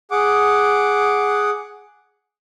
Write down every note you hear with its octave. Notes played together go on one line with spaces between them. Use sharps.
G#4 F#5 D6